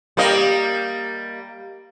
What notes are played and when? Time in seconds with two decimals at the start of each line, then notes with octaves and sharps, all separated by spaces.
0.17 G3 A#3 D#5